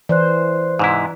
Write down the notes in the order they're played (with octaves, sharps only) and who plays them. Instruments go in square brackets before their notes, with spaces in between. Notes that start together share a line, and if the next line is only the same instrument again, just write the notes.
[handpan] E3 [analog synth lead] C5 [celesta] D5 F#6
[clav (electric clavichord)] G#2 C3 E4